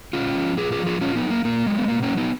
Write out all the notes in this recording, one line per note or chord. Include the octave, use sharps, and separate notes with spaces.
A#2 C#4 F4
F3
A#2 F4 G#4
F4 G#4
F3
F4 G#4
A#2 C#4 F4
B3 D#4
F#3
A#3
A#2 A#3
F#3 G#3
B3
B2 A#3
A#3 C#4
F#3
B3 D#4